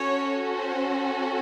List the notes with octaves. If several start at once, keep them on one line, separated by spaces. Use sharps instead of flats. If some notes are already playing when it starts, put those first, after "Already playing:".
Already playing: C#4 F#4 A4 C#5
C5